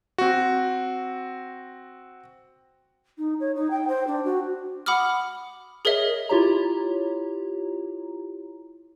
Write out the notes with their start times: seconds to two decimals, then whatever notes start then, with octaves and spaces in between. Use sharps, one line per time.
0.18 C4 F#4
3.18 D#4
3.40 C#5
3.55 D#4
3.70 G5
3.87 C5
4.07 D4
4.25 F#4
4.86 F#5 B5 D6 D#6 F6
5.85 G#4 A#4 C#5 D#5 E5
6.29 E4 F4 G4 C#5 A#5